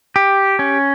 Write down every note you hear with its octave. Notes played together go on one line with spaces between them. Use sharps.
G4
C#4